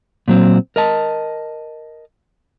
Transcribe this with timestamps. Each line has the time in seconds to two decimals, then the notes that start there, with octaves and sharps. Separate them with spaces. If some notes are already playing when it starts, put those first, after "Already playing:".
0.28 A#2 F#3 C4
0.76 A#4 D#5 A5